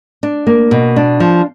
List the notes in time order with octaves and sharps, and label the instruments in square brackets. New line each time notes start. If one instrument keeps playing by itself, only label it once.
[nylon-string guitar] D4
A#3
B2
D4
F3